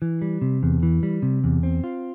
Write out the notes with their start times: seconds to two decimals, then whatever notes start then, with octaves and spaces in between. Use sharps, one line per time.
0.02 E3
0.22 G3
0.41 C3
0.63 E2
0.83 E3
1.03 G3
1.22 C3
1.44 E2
1.63 C4
1.84 F4